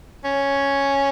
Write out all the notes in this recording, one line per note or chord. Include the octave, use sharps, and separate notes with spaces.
C#4